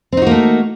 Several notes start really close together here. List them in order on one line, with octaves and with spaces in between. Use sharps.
C4 D#4 F#4 A#3 A3